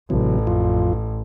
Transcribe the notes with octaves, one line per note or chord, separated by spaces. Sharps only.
A1 C3 E3 F#3
F2 F4